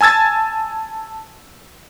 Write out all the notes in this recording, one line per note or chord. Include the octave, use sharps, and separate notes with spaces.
G#5 A5 E6 G#6 A6